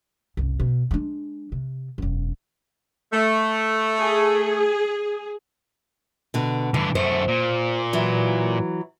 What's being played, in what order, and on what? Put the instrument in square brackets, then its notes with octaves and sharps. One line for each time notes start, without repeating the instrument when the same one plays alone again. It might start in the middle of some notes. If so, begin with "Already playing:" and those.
[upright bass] F#1 C2
B2
G#3 D4
C3
E1 F#2
[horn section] A3
[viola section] G#4
[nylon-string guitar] B2 D3
[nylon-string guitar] G2 [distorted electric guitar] D3 E3
[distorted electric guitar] F#2 A3 [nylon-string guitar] C5
[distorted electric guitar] A#2
[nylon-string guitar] E3 F#3